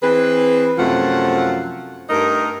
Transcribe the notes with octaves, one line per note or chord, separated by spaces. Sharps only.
E3 C4 G#4 B4
F#2 C3 F3 A3 F4 F#5
G2 A3 D#4 A#4